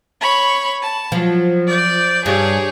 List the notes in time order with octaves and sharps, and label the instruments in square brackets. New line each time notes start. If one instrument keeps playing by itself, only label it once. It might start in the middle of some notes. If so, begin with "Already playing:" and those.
[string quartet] C#5 B5 C#6
A5
[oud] F3 [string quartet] F#3
[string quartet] D5 G6
[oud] G2 [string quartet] G4 G#4 C#5